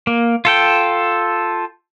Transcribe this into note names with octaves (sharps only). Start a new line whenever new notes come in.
A#3
F4 A4 G5